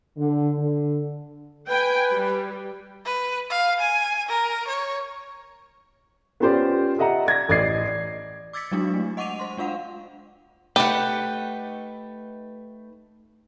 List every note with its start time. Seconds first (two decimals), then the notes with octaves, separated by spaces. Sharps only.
0.18 D3
0.58 D3
1.68 B4 G5 G#5
2.11 G3
3.06 B4
3.50 F5
3.80 G#5
4.29 A#4
4.68 C#5
6.40 B3 C#4 F4 G4 C5 D5
6.98 G4 A4 D#5 E5 F#5 A#5
7.26 D5 G#6 A#6
7.49 A1 D5 D#5 G#6 C7
7.86 D5
8.53 D6 E6 G#6 A6 B6 C#7
8.71 F#3 G#3 D4 E4 F#4
8.94 A3
9.17 D#5 F#5 C#6 D6 D#7 F7
9.39 C5 C6
9.58 G#3 D4 F4 F5 F#5
10.76 A3 D#4 G4 B4 F#5